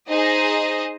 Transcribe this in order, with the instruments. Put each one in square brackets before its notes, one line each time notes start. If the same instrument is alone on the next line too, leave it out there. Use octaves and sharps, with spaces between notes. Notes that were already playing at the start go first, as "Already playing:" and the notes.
[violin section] D#4 G#4 C5 D#5